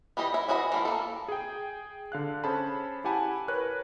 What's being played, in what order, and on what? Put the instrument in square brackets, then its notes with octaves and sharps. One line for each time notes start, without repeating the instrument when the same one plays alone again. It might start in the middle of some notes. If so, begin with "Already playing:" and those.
[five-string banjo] E3 G3 G4 D#5
E4
E3 F#4 G#4 D#5 B5
E3 A3 F4
A#3 A4
[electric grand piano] G#4 G5
D3 F5 F#6
C#4 G#4 A4 C5 A5 B5
E4 G4 F#5 G#5 A5 B5
A#4 B4 C#5 F#6